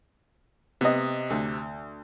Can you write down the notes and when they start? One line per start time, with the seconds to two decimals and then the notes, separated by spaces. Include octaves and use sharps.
0.81 C3 B3 D#5
1.30 D2